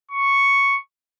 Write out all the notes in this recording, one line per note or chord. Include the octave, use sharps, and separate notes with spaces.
C#6